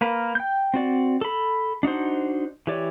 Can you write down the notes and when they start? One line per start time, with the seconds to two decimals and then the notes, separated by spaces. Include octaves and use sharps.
0.01 A#3 A#4 B4
0.35 G5 G6
0.74 C4 F#4 D5
1.21 A4 B5
1.83 D4 D#4 F#4 C5
2.67 E3 G4 C#5 D5